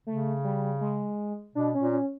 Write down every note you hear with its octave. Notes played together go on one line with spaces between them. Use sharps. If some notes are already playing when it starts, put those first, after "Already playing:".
C#3 A3
G3
G#3
B2 D4
C#4
A#2
C#4